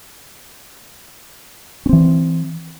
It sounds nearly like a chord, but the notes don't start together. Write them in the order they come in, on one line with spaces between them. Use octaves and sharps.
C#4 C4 E3